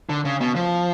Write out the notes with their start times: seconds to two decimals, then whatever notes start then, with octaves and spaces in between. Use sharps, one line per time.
0.09 D3
0.25 C#3
0.41 B2
0.56 F3